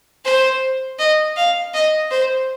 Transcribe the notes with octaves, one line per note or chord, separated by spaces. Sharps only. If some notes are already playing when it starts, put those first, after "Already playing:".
C5
D#5
F5
D#5
C5